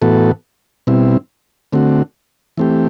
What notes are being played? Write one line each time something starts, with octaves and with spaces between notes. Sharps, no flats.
A2 E3 B3 F#4 A4
B2 G3 C4 E4
D3 A3 C4 F#4
E3 A3 C4 G4